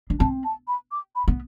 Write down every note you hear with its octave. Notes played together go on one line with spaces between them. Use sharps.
D4
C4 A5
A5
B5
D6
B5
B3